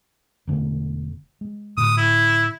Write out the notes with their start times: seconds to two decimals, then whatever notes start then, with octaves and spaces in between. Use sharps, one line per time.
0.47 E1 D3 A3
1.41 G#3
1.77 A2 D3 D#6
1.97 E4